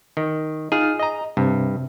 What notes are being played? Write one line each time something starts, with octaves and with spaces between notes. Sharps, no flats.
D#3
D#4 F4 G#4 F6
D#5 A#5
G2 C3